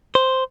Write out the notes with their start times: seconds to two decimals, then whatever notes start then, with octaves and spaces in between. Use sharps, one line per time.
0.15 C5